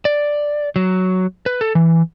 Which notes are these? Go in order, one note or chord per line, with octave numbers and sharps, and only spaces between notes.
D5
F#3
B4
A4
E3